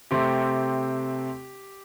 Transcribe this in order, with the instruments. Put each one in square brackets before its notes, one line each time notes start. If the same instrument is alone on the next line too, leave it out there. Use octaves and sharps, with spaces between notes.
[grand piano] C3 A3 C4 G4